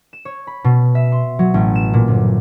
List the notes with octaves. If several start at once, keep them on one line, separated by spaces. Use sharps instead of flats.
E7
C#5
B5
B2
E5
C6
F#3
A1
E7
A#2
G1